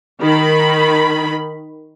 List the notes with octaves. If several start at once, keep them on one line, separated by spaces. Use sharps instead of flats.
D#3 B5